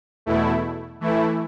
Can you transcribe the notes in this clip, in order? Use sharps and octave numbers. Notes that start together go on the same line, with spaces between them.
E2 B2 A3 E4
E3 A3 E4